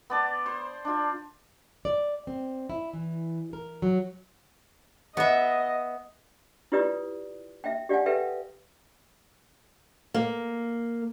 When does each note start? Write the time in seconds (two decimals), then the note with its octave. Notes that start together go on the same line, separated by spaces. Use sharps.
0.10 B3 D5 A5
0.46 C5
0.85 D4 F4
1.85 D5
2.27 C4
2.70 E4
2.93 E3
3.53 A#4
3.82 F#3
5.17 B3 D#5 E5
6.72 E4 F4 G4 B4 D5 D#6
7.64 E5 G5
7.89 G4 D5 F5 F#5 G#5
8.06 G4 A4 B4 E5 F5 G5
10.14 A#3